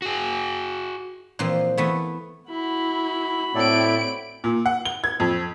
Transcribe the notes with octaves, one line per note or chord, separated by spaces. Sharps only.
F#4 G#4
A#2 E3 F3 C4
E3 A3 B3
E4 F#4 B5
A2 C4 E4 A4 D5 D7
A#2
F#5
G7
G#6
F2